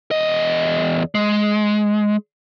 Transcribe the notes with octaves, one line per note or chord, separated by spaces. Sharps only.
E2 D#5
G#3